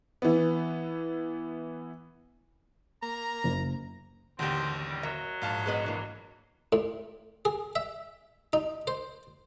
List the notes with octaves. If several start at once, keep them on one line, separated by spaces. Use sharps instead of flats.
E3 B3
A#3 A#4 A#5
F#1
A1 D#2 D3 C4 F#4 G4
G3
F#3 A#4 E5 D#6
A#1 G#2 F5 A5
G#3 B3 D#5
E3 A#3 D4
A2
G#4
E5
D#4
C5